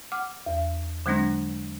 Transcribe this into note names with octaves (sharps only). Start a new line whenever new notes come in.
F#5 D6 F6
E2
D3 F#3 G#3 C4 D4 A#6